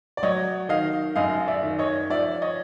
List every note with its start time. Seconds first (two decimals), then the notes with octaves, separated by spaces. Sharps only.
0.17 D5
0.23 F#3 C#5 D#5
0.69 D#3 D#5 F5
1.16 F#2 D#5 F5
1.47 D5 E5
1.63 D#3
1.79 C#5 D#5
2.10 F3 D5 E5
2.42 C#5 D#5